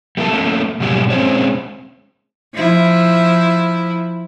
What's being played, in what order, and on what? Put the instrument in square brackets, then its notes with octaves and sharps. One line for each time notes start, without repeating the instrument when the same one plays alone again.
[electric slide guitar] G3 A3 A#3 G4 A4
A3 A#3 C#4
G#2 B2 F#3 G3 G4 G#5
G#3 C4 C#4 G#4 C5 C#5
[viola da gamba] F3 E4